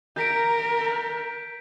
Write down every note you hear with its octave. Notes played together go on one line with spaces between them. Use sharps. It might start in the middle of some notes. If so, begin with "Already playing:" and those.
A#4 G6 B6 D7